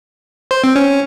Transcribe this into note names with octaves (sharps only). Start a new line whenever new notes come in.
C5
C4
C#4